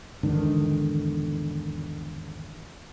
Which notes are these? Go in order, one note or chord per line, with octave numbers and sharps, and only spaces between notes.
E2 G#2 D3 D#3